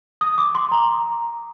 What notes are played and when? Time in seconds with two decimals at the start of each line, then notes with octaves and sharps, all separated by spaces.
0.21 D#6
0.38 D6
0.55 C6
0.72 A#5